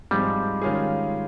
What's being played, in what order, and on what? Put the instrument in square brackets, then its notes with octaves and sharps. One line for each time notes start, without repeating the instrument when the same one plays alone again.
[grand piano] G#2 F3 G#3 C4 [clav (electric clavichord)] G3
[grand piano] D#3 G#3 C#4 F4 G#4